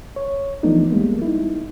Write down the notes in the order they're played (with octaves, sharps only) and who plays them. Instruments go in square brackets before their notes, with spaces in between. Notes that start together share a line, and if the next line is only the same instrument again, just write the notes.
[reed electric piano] C#5
E3 F3 A3 B3 D4 D#4
G3 G#3 A#3 B3
D#4 E4